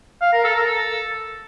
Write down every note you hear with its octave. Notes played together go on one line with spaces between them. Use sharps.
F5
A#4
A4
A#4
A4